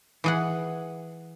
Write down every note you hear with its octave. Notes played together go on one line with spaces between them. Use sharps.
E3 G#4 F#5